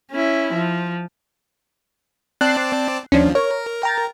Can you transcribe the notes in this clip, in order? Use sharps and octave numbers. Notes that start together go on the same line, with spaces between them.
C#4 E4
F3
C4 D5 A5 F#6 C7
D#2 F3 C#4 D4
A#4 C#5
G5 A#5 A6